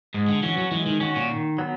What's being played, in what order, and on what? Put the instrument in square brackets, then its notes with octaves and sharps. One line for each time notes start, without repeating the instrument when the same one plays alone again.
[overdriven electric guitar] G#2 [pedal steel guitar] G#3
[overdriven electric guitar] D3
[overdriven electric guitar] E3 [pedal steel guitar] C#4 F#4
[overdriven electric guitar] F#3
[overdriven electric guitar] E3 [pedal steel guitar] G#3
[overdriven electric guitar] D#3
[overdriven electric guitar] D#3 [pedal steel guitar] C#4 F#4
[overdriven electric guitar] A#2
[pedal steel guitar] D#3
F#3 B3